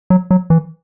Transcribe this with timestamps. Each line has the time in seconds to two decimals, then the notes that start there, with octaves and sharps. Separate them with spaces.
0.10 F#3
0.31 F#3
0.50 E3